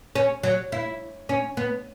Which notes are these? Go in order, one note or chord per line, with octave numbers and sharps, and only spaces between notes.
C#4
F#3
E4
C#4
B3